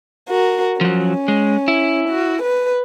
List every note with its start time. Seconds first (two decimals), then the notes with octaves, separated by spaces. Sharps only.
0.29 F#4 A#4
0.81 F3 F#3 C#4
1.28 G#3
1.68 E4
2.09 F#4
2.42 B4